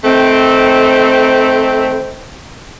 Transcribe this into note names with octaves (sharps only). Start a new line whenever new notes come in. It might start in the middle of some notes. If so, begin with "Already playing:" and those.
D#3 A3 C4